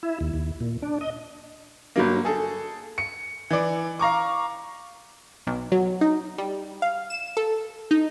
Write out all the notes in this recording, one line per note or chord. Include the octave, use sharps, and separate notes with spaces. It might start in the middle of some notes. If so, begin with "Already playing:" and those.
E4
D#2
D#2
A#2
D4
D#5
G1 F#3 A#3
G#4 A4
C#7
E3 D5
F5 A#5 C#6 D6
B1
F#3
D#4
G3
F5
E7
A4
D#4